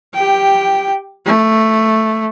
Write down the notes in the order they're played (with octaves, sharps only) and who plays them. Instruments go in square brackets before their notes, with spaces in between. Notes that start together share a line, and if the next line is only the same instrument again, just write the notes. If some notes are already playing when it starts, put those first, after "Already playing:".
[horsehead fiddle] G4 G5
A3